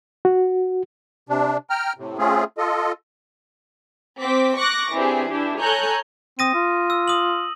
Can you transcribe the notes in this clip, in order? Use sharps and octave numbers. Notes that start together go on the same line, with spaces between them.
F#4
C3 D4
G5 A#5 F6
A2 C3
A3 C4 C#4 F4 G#4
F4 A4 D#5
C4 D6 B6
C#6 D6 F#6 A#6
E3 C4 D4 G4 G#4
D4 E4 G4
A4 C#5 G#5 A#5 F#6 G6
C4 D#6 A#6 D#7
F4
E6
D#6 F#7